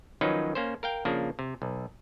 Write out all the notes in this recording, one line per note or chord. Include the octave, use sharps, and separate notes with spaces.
D#3 F3 F#3 C#4 D#4 B4
A#3 C#4 C5
A#4 F5 G5
C#3 F3 A#3 D4
C3
B1